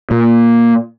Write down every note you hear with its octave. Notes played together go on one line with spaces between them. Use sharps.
A#2